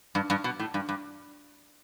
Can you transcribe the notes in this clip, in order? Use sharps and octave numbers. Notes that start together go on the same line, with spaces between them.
G2
G2
B2
A2
G2
G2